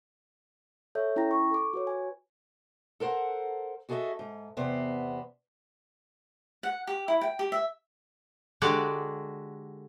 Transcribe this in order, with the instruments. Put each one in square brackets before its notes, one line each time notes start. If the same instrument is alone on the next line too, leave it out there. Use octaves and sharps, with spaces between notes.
[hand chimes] A4 C#5 E5 G6
C#4 E4 G5 A#5 A#6
C#6
A4 D6
F#4 B4 C#5
G#5
[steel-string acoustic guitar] A4 A#4 C5 F#5
F#4 G#4 A4 C#5 D#5 E5
G#2
E2 C3 B3 C5
[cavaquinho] F#5
G4
E4
G5
G4
E5
[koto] D3 G#3 F#4 G4 D5